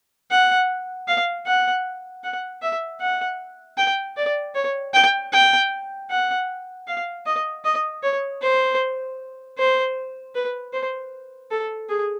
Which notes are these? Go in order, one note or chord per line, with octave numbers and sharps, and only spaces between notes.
F#5
F5
F#5
F#5
E5
F#5
G5
D5
C#5
G5
G5
F#5
F5
D#5
D#5
C#5
C5
C5
B4
C5
A4
G#4